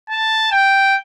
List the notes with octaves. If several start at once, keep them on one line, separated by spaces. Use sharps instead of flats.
A5
G5